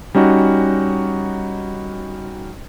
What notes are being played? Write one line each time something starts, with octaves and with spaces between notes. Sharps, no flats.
G3 C#4 D#4 F#4